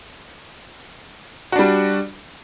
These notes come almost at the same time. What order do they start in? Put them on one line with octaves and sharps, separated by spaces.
F#4 D4 G3